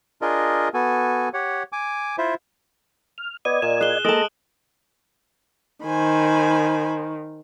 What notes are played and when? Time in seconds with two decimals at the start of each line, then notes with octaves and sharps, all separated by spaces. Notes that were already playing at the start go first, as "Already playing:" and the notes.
0.22 D4 F4 G#4 A#4 D#5
0.74 B3 F#4 A4 G#5
1.34 G4 C#5 F#5
1.72 G#5 D6
2.18 E4 F4 C5 E5
3.18 F6
3.45 B3 D5 D#5 G#6 D#7
3.62 A#2 E7
3.81 G#4 F#6 E7 G7
4.05 G#3 A#3 A4 A5 A#5 D#6 D7 F#7
5.85 D#3 C5 G#5 B5